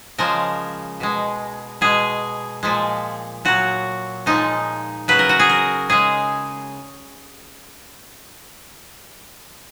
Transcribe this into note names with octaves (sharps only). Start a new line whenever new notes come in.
C#3 F3 G#3 A#4
B2 G#3
B2 G#3 G#4
A#2 F3 G#3
A#2 F#3 F#4
A#2 F3 G#3 D#4
C#3 F#3 B4
A#4
F#4
G#4
A#4
C#3 G#3 G#4